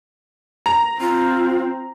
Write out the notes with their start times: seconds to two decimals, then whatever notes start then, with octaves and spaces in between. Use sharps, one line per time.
0.66 A#5
1.01 C4 F4